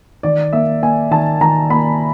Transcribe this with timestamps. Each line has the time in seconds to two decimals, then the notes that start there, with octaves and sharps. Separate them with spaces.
0.23 D#3 D5
0.53 A#3 E5
0.83 A#3 G#5
1.11 D#3 A5
1.41 D#3 A#5
1.70 A#3 B5